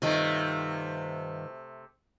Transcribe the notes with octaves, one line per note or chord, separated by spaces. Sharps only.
G2 C3 D#3 A3 F4